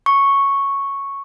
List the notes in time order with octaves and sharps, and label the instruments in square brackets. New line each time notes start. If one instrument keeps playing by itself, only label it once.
[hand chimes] C#6